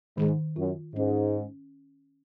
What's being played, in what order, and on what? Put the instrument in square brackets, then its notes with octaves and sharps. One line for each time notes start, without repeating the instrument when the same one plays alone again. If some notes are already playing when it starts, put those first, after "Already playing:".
[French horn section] G#2 [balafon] D#3
[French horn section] F#2 [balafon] F4
[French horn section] G#2 [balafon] C#4